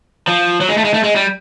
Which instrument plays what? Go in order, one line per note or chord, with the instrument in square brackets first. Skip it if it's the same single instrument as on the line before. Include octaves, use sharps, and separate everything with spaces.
[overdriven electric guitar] F3
F#3
G#3
A3
G#3
A3
G#3
G3